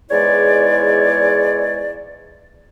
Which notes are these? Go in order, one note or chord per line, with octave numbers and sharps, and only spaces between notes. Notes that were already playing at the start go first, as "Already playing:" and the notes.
E2 G#2 G#3 E4 C#5 D5